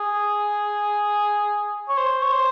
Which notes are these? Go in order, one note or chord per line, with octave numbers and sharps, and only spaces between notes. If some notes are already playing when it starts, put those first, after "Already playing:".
Already playing: G#4
C#5
C5
C#5
C5